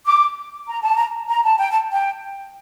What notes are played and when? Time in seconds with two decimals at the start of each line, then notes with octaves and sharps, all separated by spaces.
0.06 D6
0.68 A#5
0.82 A5
0.96 A#5
1.30 A#5
1.44 A5
1.58 G5
1.72 A5
1.92 G5